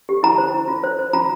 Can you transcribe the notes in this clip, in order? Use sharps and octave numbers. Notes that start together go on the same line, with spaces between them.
G4
E4 A#5
C5
E4
F4
C5
C5
F4 A#5